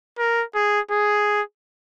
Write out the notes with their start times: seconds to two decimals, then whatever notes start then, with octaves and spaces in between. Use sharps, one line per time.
0.19 A#4
0.55 G#4
0.91 G#4